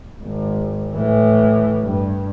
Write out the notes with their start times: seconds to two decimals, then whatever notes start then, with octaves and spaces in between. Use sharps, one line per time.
0.22 G#1
0.95 A2 E3
1.82 G2